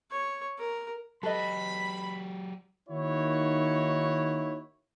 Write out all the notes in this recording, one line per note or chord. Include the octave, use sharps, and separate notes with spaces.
C#5
A#4
F#3 G4 A4 B4 D#5 B5
D#3 A#3 D#4 E4 F#4 C#5